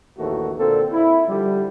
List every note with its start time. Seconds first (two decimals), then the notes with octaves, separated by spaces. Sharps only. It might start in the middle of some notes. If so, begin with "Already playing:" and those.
0.17 A#1 D#2 E3 A3 F#4
0.58 A#2 D3 A#3 C4 A4
0.92 E4
1.27 D3 F3 G3